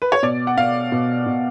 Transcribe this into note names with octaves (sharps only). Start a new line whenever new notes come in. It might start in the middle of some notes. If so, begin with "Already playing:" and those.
B4
C#5
B2 D5
F#5
B2 F5
B2
B2